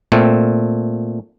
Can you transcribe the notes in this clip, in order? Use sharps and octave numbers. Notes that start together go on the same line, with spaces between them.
A#2 A3 C4